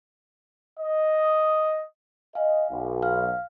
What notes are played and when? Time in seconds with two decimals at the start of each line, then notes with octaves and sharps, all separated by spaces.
0.80 D#5
2.35 D#5 F5 G#5
2.71 B1
3.02 F5 F6